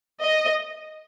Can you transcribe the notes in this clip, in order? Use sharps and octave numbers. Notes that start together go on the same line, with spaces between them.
D#5